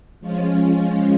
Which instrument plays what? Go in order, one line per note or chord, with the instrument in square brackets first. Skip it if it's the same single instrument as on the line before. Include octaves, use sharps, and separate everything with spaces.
[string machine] F3 G#3 C#4 F4